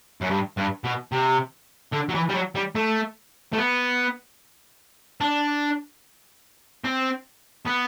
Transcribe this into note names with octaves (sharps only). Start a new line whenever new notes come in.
F#2
G2
G2
B2
C3
D3
F#3
E3
G3
F#3
G3
A3
A3
B3
D4
C4
B3